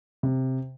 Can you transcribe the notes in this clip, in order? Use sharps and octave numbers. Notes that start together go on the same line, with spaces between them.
C3